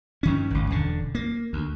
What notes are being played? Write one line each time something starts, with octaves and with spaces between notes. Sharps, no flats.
G2 D#3 C#4
G#1 C#2
E1 D3
A#3
D2